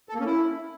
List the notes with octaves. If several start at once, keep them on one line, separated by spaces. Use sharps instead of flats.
A4
A#3
C#4
E4